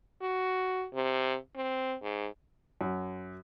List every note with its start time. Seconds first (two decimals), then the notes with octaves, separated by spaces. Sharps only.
0.21 F#4
0.94 C3
1.56 C4
2.02 G#2
2.81 F#2